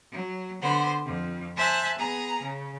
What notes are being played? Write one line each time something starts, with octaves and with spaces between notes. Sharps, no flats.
F#3
D3 B3 C5
F2
C5 E5 G#5 A5 F#6
B3 G#4 A#5
C#3